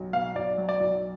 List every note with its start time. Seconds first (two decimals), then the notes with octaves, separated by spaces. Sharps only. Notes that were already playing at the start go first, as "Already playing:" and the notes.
Already playing: B1
0.13 B2 F5
0.35 B1 D5
0.57 F#3
0.69 D5
0.80 B1